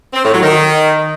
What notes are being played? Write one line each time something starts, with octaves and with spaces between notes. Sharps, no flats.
C4
A2
F#3
D#3